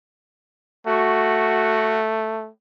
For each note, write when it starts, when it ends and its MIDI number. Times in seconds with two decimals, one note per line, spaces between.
0.87 2.49 57
0.87 2.02 66